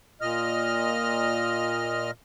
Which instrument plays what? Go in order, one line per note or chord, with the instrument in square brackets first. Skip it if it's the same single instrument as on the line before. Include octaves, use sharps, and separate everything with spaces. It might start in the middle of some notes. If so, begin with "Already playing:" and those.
[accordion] A#2 D#5 F6